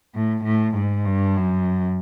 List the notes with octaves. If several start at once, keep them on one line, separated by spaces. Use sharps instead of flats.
A2
A2
G#2
G2
F#2